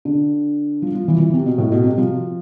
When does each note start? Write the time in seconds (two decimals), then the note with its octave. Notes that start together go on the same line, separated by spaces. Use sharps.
0.05 D3
0.82 F3
0.95 F3
1.08 E3
1.20 E3
1.33 C3
1.46 B2
1.58 A2
1.72 B2
1.84 C3
1.98 F3